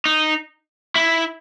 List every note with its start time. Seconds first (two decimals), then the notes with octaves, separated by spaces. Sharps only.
0.05 D#4
0.96 E4